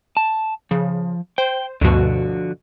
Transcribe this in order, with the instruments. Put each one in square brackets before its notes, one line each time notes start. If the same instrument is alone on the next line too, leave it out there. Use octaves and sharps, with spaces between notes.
[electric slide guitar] A5
[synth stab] C#3 [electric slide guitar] F3
[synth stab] C5 [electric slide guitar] G5
[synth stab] D2 G2 B2 [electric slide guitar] D3 F3 F#4